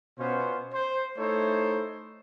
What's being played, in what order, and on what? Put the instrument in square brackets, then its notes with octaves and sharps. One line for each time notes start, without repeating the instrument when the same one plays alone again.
[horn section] B2 B3 C#4 F4 C5
C5
A3 D#4 E4 A4 C5 C#5